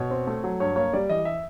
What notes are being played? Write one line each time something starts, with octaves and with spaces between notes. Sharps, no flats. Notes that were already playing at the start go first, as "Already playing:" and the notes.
Already playing: B2 C#5
C4
A3
F#3
G2 C#5
A#3 C#5
G3 D5
E3 D#5
E5